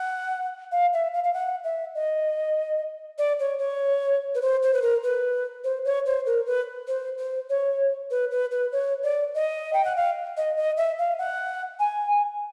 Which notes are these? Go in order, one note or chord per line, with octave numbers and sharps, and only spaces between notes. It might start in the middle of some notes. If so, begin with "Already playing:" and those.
Already playing: F#5
F5
E5
F5
F5
F#5
E5
D#5
D5
C#5
C#5
B4
C5
C5
B4
A#4
B4
C5
C#5
C5
A#4
B4
C5
C5
C#5
B4
B4
B4
C#5
D5
D#5
G5
F#5
F5
D#5
D#5
E5
F5
F#5
G#5